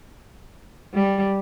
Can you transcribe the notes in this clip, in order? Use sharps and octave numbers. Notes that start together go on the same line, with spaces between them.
G3